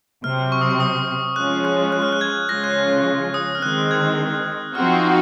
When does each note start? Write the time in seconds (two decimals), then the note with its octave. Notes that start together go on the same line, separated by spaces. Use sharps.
0.24 C3 F#3 C4 F6
0.52 C#6
0.61 D#6
0.70 C#6
0.80 D#6
1.36 F3 G#3 C#4 F4 F#6
1.65 F#6
1.93 F#6
2.02 F6
2.13 F#6
2.21 G#6
2.49 C#3 F3 G#3 C#4 F4 A#6
2.64 F#6
3.34 D#6
3.55 F6
3.62 D#3 G#3 C4 F#6
3.91 G#6
4.75 F3 C4 D#4 F#4 F6